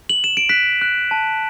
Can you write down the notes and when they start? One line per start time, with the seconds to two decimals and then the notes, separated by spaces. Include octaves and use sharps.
0.09 F#7
0.24 E7
0.37 D7
0.49 F#6 B6
0.81 F#6
1.11 A5